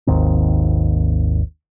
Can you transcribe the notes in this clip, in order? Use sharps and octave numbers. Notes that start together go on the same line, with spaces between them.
G#1 D#2 D#3 C4